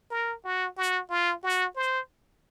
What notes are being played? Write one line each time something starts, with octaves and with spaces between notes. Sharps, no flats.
A#4
F#4
F#4
F4
F#4
C5